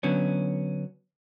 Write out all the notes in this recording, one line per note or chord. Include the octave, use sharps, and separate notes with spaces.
D3 F#3 B3 C#4